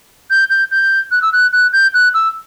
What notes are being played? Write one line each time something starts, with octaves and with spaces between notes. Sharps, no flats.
G6
G6
G6
F#6
E6
F#6
F#6
G6
F#6
E6